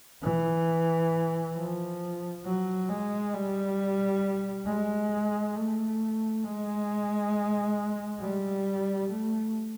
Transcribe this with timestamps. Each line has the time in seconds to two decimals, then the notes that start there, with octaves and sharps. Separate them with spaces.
0.23 E3
1.56 F3
2.44 F#3
2.89 G#3
3.34 G3
4.67 G#3
5.56 A3
6.44 G#3
8.21 G3
9.10 A3